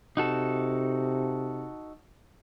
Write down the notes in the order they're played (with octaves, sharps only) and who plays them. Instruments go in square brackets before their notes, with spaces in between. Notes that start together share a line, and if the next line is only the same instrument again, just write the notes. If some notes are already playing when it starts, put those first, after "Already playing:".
[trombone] C3 [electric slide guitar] D#4 F#4 A4